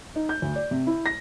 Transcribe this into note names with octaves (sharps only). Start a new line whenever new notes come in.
D#4
G6
D2
D5
C3
E4
A#6